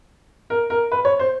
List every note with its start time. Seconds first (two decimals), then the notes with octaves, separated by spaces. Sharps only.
0.50 A#4
0.70 A#4
0.92 B4
1.05 C#5
1.19 C5